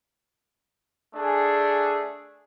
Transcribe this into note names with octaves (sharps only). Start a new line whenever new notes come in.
A3 D4 G#4